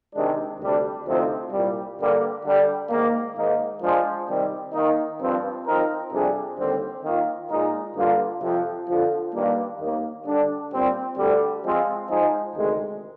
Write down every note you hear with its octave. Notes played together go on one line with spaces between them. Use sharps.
C3 D#3 G#3 D4
D2 C3 G3 D4
D2 C3 F3 C4 D#4
C2 A#2 G3
G2 D3 G3 A#3
D3 G3 D4 G4
G#2 D#3 A#3
G#2 D#3 A#3 D#4
F3 G#3 D4 G#4 C5
C3 D#3 G3 C4
D#3 A#3 D#4
G2 F3 C4
F3 C4 D#4 A#4
F2 C3 G3 D4 G#4
D#2 D3 G3 C4
D#3 A#3 F4
A#2 G#3 D#4 A#4
G2 D3 G3 A#3 F4
F2 C3 F3
F2 D3 F3
G2 D#3 G3 A#3
D#2 D#3 A#3
D3 G3 D4
A#2 G3 C4
D2 D3 G3
F3 G#3 C4 F4
F3 G#3 D#4 G#4 C5
D2 C3 D#3 G#3